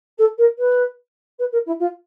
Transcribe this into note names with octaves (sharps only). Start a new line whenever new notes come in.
A4
A#4
B4
B4
A#4
E4
F4